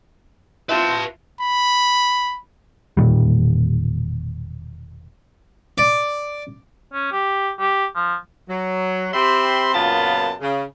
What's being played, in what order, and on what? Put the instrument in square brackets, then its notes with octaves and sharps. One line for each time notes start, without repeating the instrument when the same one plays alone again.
[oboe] C4 [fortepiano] E4 F4 [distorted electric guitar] B4 A5
[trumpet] B5
[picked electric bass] E1 A#2 D#3 G3
[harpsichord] D5
[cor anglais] C#4
G4
G4
F3
[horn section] F#3
C4 G4 E5 B5 C6
F#2 A#2 C#3 B3 F4 A5
C#3